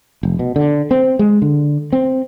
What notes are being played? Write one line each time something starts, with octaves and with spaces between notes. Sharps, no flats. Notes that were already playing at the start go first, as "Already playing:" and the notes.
F1
B2
D3
C4
G#3
D3
C4